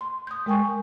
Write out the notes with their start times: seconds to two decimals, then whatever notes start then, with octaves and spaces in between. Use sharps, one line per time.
0.01 C6
0.27 D#6 G6
0.46 G#3 A#4 G5 G#5 C#6